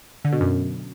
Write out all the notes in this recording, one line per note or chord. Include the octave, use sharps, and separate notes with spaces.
D3
B2
F#2